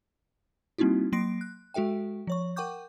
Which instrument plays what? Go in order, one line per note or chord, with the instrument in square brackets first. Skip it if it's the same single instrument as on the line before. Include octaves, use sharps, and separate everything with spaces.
[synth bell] G3 A#3 C4 D#4 E4 F#4
F#3 A#3 C6 A#6 C7 D7
F#6
G#3 F#4 A4 E5 G5
F3 C#5 C#6
A#4 F#5 G5 C#6 D6 G6